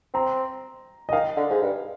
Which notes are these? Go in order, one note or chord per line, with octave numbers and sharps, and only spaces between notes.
C4 A#5
D#5
D#3 F5
D3
G#2
G2